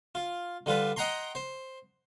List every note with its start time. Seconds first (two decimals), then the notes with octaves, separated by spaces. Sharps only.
0.15 F4
0.66 D3 G3 F4 B4
0.96 D#5 F#5 G5 A#5 C6
1.35 C5